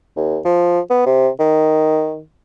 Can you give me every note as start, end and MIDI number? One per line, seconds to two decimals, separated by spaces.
0.16 0.38 39
0.45 0.79 53
0.90 1.03 59
1.06 1.29 48
1.39 2.21 51